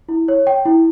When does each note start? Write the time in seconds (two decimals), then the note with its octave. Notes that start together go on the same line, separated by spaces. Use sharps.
0.09 E4
0.28 C#5
0.47 G5
0.65 E4